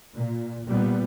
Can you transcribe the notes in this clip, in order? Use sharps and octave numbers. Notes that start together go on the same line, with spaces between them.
A#2
A#2 G3 B3